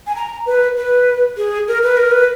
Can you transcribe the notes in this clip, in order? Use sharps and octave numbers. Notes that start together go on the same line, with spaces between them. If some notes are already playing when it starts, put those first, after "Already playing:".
G#5
A#5
B4
B4
G#4
A#4
B4
A#4
B4